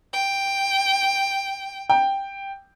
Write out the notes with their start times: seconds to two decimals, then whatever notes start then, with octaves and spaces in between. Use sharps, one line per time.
0.13 G5
1.90 G5